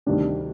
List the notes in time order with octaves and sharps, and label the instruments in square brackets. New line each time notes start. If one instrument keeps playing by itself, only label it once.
[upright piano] D2 C3 D#3 G3 D4